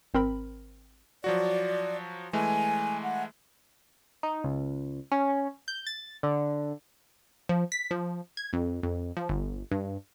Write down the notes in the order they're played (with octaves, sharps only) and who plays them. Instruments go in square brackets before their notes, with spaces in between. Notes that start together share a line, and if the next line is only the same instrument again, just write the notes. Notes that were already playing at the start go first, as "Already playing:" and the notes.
[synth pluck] G#1 C4 A#4 B5
[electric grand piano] F3 F#3 F#4 [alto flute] D5
[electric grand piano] E3 G#3 A3 [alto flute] G#5
[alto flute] F#5
[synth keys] D#4
C#2
C#4
G6
A6
D3
[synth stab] F3
B6
F3
G#6
F2
F2
F3
G1
G2